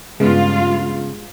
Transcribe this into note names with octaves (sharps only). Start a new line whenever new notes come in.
G2 C#3 G#3 B3 F4 F5